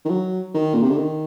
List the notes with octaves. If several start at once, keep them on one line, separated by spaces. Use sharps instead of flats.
D#3
F#3
D#3
A#2
C3
D3
D#3